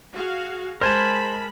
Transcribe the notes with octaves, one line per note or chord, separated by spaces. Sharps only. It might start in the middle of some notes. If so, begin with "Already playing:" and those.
F#4 G#4 F5
G#3 A#4 C5 G#5 A5 B5